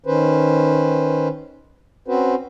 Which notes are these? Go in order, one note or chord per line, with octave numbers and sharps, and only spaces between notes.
D#3 C#4 B4 C5
C4 C#4 F#4 B4 C5